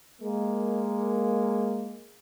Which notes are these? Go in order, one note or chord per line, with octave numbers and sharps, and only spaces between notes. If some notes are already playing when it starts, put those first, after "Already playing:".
G#3 A#3